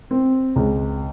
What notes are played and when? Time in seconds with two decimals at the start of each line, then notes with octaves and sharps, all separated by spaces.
0.11 C4
0.56 C#2